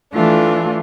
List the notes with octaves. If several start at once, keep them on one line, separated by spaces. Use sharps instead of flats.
E3 A3 D4 F4